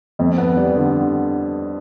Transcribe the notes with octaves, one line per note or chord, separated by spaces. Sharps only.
F2
B3
G3
D3